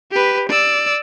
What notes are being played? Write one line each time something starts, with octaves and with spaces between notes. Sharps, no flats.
G4 B4
D5 E6